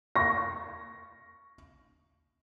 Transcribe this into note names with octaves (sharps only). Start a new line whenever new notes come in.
C#6 A#6